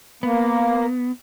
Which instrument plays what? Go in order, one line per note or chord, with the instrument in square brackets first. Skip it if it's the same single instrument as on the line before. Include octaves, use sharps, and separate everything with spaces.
[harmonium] A#3 [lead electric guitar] B3